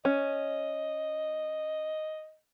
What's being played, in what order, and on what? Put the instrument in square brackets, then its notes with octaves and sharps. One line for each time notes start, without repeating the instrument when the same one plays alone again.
[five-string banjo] C#4 [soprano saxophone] D#5